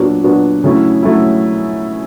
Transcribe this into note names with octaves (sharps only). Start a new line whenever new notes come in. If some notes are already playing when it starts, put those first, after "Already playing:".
Already playing: A#2 F#3 B3 D4 F#4
A#2 F#3 B3 D4 F#4
C#3 F#3 A3 C#4 E4
F#3 A3 C#4 E4